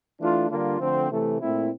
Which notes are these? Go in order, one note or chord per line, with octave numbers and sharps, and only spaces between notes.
E3 A3 D4 F4
D3 G3 A#3 D4 F4
D3 F3 A3 C4
C3 E3 A3
A#2 A3 C4 E4